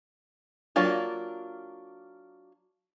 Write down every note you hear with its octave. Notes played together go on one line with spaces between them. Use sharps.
F#3 A#3 D4 F4